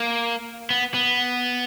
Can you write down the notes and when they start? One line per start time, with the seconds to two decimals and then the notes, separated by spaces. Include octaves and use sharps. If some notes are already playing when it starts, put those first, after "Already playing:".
Already playing: A#3
0.70 B3
0.94 B3